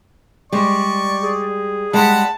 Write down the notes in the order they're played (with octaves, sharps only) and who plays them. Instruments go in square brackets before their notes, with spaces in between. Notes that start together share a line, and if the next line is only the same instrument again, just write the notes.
[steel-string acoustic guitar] G3 G#3 [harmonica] D5 C#6
[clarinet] G#4
[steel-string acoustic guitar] G3 G#3 [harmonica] F#5 B5 [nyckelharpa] A5